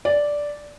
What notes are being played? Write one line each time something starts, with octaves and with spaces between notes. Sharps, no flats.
D5